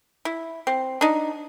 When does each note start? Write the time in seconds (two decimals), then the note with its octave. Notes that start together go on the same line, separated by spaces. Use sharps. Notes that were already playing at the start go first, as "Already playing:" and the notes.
0.25 E4
0.67 C4
1.01 D4 D#4